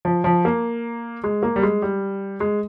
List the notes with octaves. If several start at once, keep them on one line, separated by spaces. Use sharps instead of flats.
F3
F3
A#3
G#3
A#3
G3
G#3
G3
G#3